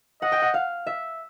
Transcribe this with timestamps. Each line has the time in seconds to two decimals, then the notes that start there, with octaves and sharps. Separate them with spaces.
0.22 D#5 F#5
0.32 G5
0.42 F#5
0.54 F5
0.87 E5